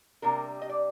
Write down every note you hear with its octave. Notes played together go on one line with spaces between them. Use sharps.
C3 G3 A#3 D4 A#4
D#5
D5